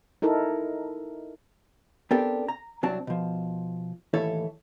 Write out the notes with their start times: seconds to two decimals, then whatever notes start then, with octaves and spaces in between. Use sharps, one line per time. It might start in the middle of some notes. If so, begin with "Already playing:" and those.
0.22 D#4 E4 A4 A#4
2.11 B3 C4 D4 G4 A4 A#4
2.48 A#5
2.83 C2 F#3 C4 D4 A5
3.07 B2 F3
4.13 D#2 A2 E3 E4 A4 C#5